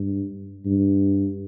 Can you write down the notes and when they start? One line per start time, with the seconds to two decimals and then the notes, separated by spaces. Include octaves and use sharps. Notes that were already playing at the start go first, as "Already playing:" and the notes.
Already playing: G2
0.66 G2